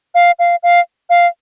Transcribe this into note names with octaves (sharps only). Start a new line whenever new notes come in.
F5
F5
F5
F5